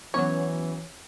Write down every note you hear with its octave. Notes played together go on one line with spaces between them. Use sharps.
E3 F#3 B3 C#4 C#5